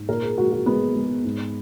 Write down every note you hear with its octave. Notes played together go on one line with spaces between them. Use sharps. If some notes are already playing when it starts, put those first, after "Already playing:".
Already playing: G#2
A#2 A#4
G#4
G#3 F#4
F#4
G#3 B3
G#3
G#2